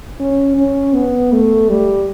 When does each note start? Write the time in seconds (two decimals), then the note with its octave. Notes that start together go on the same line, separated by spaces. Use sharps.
0.20 C#4
0.57 C#4
0.94 B3
1.32 A3
1.69 G3